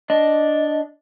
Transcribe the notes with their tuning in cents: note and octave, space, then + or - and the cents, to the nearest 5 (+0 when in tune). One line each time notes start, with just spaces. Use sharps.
D4 +0 D#5 +0